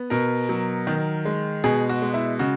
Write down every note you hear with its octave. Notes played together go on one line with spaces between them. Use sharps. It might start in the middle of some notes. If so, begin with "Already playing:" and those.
Already playing: B3
B2 A#4
F#3
D#3
G#3
B2 G#4
F#4
G#3
E4
C#3 F#4